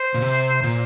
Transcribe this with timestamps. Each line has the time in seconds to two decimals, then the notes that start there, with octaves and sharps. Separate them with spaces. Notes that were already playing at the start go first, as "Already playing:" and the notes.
Already playing: C5
0.14 A#2
0.21 C3
0.63 A#2 C5